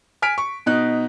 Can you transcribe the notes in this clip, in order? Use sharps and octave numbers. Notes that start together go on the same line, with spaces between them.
G#5 F6 B6 D7
C#6
B2 D#4 F#6